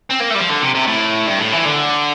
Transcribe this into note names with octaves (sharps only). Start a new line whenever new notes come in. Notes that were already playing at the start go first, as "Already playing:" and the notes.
C4
A#3
A3
G3
F3
D3
C3
C3
A2
G2
A2
E3
D3